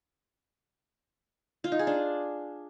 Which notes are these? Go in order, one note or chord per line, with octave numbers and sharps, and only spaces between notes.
F4
D#4
G#4
D4